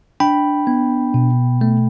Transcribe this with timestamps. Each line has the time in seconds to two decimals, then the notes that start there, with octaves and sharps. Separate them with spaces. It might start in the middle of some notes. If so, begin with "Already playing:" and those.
0.20 D4 G5 B5
0.67 B3
1.14 B2
1.61 A3